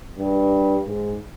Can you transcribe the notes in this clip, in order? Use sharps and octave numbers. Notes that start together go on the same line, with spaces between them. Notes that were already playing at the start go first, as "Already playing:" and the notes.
G2
G#2